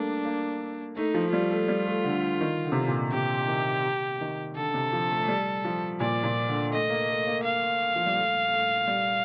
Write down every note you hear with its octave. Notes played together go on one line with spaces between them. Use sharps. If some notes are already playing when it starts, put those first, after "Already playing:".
Already playing: G3 A3 A#3 D4
A#3
A3 D#4
F3
G3 F4
A3
G3
A3
D3
D#3
D3
C3
D3
A#2
C3 G4
D#3
D#3
D3 A4
C3
F3
A3
A3
G3
F3
A#2 D5
A#2
D3
A3 D#5
A#3
A3
A#3
F5
F3
G3
A3
A3
G3